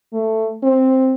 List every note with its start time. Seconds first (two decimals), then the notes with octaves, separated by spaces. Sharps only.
0.14 A3
0.63 C4